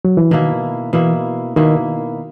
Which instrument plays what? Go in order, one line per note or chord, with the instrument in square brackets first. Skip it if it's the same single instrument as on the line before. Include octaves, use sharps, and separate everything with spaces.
[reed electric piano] F#3
E3
[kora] B2 A#3 E4 [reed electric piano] D#3
[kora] B2 A#3 E4 [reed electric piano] E3
[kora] B2 A#3 E4 [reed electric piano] D#3